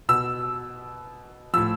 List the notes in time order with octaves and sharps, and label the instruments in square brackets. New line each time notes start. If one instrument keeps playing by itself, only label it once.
[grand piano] B2 E6
A2 F3 E6